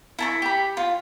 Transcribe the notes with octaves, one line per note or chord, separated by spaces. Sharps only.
E4 A5 C#6
G4 B5
F4